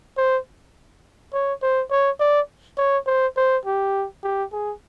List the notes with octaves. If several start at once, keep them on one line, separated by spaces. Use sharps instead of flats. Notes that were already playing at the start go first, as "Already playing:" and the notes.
C5
C#5
C5
C#5
D5
C#5
C5
C5
G4
G4
G#4